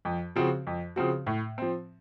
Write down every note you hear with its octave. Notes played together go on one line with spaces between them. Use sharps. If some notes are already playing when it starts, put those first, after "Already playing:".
F2
C#3 F3 C4 F#4
F2
C#3 F3 C4 F#4
A2
F3 C4